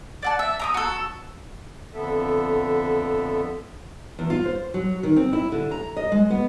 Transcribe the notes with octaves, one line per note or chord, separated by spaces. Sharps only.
D5 F#5 A5
E5
A#5 D6 D#6
F#4 A4
F2 D3 B3 A4 E5
E2
F4
C5
F#3
D#3
C4
E4
D3
A#5
D#5
G#3
B3